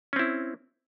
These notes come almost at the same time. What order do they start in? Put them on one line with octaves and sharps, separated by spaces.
C#4 C4 E4